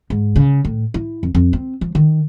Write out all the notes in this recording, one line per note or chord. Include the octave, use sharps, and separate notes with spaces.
G#2
C#3
A2
E4
F2
F2
C4
F3
D#3